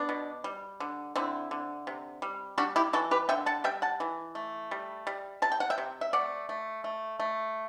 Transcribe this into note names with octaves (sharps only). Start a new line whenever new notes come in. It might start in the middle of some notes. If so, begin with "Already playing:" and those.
Already playing: B3 D4
B2
G3
D3
D3 C4 E4
D3
C3
G3
G3 D4 F#4
E4 G4
E3 F#4 A4
G4 B4
D3 E5 G5
F#5 A5
G3 E5 G5
F#5 A5
E3
A3
G3
G3
C3 A5
G5
F#5
E5 G5
C3
E5
A3 D5 F#5
A3
A3
A3